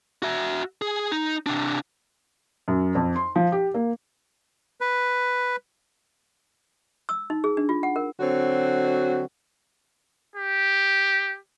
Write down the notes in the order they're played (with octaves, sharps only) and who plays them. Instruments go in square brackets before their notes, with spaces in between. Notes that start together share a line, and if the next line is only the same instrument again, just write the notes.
[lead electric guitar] F#4 E5
G#4
D#4
C3 D4
[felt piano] F#2
F2
C6
F3
G4
A#3
[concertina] B4
[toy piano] E6
D#4
G#4
D4
F4
F#5
A#4
[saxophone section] D3 F#3 C4 F#4
[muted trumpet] G4